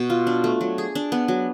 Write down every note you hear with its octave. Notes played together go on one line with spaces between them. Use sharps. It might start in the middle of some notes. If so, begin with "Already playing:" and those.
Already playing: B2
F4
D4
A3
F#3
G#4
D4
B3
F#3